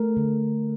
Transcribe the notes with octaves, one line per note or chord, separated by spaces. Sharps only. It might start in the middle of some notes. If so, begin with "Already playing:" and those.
Already playing: A3 A#4
D3